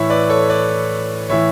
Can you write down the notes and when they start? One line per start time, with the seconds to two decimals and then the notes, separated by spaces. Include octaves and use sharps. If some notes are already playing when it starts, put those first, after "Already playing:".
Already playing: A2 E3 C#5 E5
0.10 B4 D5
0.29 A4 C#5
0.50 B4 D5
1.29 A2 E3 C#5 E5